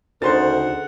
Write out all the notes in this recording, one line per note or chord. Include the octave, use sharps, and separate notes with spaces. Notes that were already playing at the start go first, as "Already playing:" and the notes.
D2 C#3 D#4 A#4 C5 F#5 C6 A6